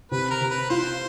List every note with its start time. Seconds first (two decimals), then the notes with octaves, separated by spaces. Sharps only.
0.12 C3 B4
0.31 A#4
0.41 C3
0.50 B4
0.70 F4 C5